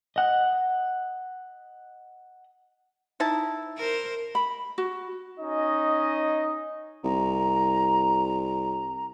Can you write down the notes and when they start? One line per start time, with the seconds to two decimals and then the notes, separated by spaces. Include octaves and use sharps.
0.16 D#5 F#5
3.20 D#4 E4 A5
3.77 A#4 C5
4.35 B5
4.78 F#4
5.39 C#4 D#4 D#5
7.04 C2 A#5